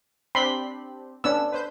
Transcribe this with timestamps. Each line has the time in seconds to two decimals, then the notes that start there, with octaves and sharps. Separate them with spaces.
0.35 C4 D4 G4 B5 C6
1.24 B3 C#4 D4 E6
1.52 B4 C5 G6